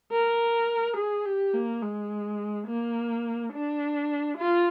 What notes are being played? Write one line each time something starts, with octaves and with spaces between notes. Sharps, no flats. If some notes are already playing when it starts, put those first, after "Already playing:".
A#4
G#4
G4
A#3
G#3
A#3
D4
F4